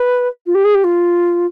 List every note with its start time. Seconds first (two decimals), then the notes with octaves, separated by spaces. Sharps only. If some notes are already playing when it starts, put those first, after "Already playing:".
Already playing: B4
0.46 F4
0.55 G4
0.64 G#4
0.74 G4
0.84 F4